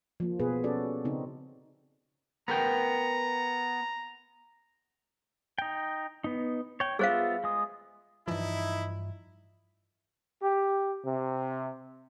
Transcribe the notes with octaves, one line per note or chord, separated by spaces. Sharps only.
F3 A#3
B2 B3 G#4 B4
C#4 F#4 A4 D5
C#3 C4 D#4
B3 A#4 G5 A#5
D#4 G5
B3 D#4
C#5 G5
B3 F4 G#4 C5 E5 F5
G#3 D#6
G2 E3 F3 D#4 E4
G4
C3